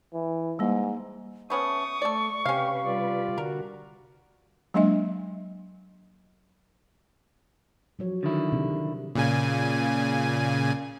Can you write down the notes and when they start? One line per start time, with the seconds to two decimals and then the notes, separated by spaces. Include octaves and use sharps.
0.13 E3
0.59 G#2 G3 A#3
1.50 A3 B3 C#4 C#6 D#6
2.02 A3 A4 D5
2.45 C3 C#4 G4 B4 F5 B5
2.85 G3 F4 D5
3.38 D3 F#4 A#4
4.74 F#3 G#3 A#3 D4 D#5 E5
7.99 F3 F#3 C#5
8.23 D3 D#3 E4
8.52 C3
9.15 A#2 C#3 G#5